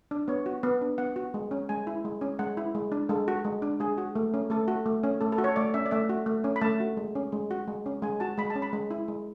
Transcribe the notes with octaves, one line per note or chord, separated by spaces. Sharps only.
D4
B3 C#5
F#4
B3
D4
B3 F#5
F#4
G#3
C#4
G#3 G#5
E4
G#3
C#4
G#3 F#5
E4
G#3
D4
G#3 A4
F#4
G#3
D4
G#3 G#4
F#4
A3
C#4
A3 A4
F#4
A3
C#4
A3 A4
A4
F#4
C#5
A3 D5
C#4 E5
D5
A3 E5
F#4
A3
C#4
B5
A3 A5
F#4
G#3
C#4
G#3
F#4
G#3
C#4
G#3 G#5
F#4 A5
G#3 B5
A5
C#4
B5
G#3
E4
G#3